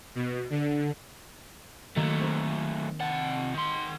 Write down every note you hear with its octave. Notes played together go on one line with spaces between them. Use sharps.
B2
D3
D#3 F#3 A3 A#3
C4 A#4
C3 F#5 A5 A6
D#3 C6